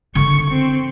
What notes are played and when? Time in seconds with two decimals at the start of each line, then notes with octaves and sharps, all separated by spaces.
0.15 D3 D#3 C#6
0.50 C4